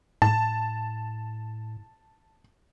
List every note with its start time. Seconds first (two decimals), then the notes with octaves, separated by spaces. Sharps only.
0.22 A2 A5